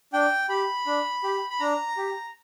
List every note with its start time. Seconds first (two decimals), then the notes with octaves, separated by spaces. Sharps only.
0.13 D4 G5
0.49 G4 B5
0.86 D4
1.23 G4
1.50 B5
1.60 D4 A#5
1.97 G4